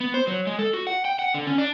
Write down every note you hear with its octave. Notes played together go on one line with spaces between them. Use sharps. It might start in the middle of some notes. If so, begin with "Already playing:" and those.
B3
C5
F#3
G#3
A4
F#4
F#5
G5
F#5
D3
C#4
D4